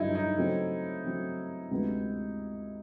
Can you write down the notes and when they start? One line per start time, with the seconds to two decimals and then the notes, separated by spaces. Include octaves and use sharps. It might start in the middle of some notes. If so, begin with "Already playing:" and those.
Already playing: G2 D3 F#3 D#4 E4
0.15 D#4
0.37 C#3 F#3 A3 C4
1.04 C#3 F#3 A3 C4
1.71 D2 C3 E3 G#3 B3